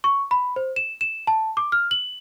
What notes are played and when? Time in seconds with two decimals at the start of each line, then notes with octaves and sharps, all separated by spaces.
0.04 C#6
0.31 B5
0.56 C5
0.76 E7
1.01 E7
1.27 A5
1.57 D6
1.72 F6
1.91 F#7